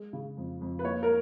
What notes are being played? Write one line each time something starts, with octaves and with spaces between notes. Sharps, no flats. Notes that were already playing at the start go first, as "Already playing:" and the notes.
Already playing: G#3
C#3
F2
F2
B4
A#3 C#5
A#4